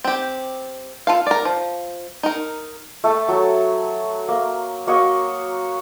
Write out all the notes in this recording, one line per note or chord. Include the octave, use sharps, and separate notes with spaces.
C4 G4
F4 A4 F5
A#4 D5
F3
D#4 A#4
A3 A4 G5 A5
F#3 A4
A#3
A#3 F#4 C#5 D#5